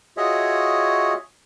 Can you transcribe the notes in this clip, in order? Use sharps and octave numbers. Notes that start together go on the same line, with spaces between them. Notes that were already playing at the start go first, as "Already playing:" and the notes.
F4 F#4 G#4 C#5 D#5 E5